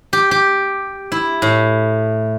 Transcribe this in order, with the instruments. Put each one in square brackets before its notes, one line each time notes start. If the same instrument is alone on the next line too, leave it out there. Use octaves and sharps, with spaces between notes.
[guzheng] G4
G4
E4
A2